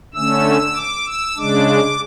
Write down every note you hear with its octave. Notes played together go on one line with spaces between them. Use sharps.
D3 A3 C#4 E6
D6
E6
C#3 G#3 D4 D6